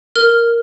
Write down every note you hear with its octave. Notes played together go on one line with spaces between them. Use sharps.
A#4 F6